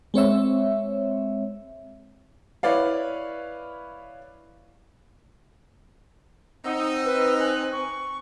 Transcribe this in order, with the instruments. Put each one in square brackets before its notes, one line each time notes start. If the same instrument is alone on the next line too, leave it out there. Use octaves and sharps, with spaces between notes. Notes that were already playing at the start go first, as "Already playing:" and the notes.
[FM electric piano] G#3 C4 C#5 E5
[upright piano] E4 B4 C#5 D5 F5
[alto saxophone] C4 [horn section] D#4 [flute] F#5 [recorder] E6
[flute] B4
[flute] G#5 [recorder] F#6
[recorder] C#6